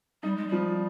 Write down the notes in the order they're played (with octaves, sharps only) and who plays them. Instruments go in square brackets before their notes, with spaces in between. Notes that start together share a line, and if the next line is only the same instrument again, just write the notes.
[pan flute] G3 [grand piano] D#4
[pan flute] G#3
[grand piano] F3 [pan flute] G3